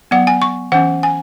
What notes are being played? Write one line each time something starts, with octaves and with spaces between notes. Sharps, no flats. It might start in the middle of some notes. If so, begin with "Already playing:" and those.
F#3 B3 F#5
G#5
C#6
E3 C#4 F#5
G#5